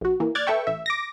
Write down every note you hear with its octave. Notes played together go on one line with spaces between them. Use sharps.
A#1 F#4
E3 A#3
D5 F6 F#6 G#6 A6
A4 B4 E5 G5 C#6
A1 E5
D6 A#6